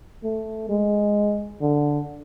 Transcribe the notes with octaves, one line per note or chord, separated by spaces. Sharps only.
A3
G#3
D3